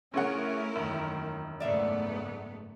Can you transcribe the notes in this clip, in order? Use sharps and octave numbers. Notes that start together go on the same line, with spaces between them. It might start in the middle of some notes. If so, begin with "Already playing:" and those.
A#1 C#3 A3 C#4 E4 A#4 F#5
E1 F#2 D#3
F#1 G#2 A3 B3 D5 E5 F5